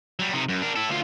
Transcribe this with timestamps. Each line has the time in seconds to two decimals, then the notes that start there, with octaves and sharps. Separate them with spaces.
0.19 F#3 G3
0.33 C3 D#4
0.49 F#2
0.62 D4 A#4
0.76 E4 A4
0.90 D2 F4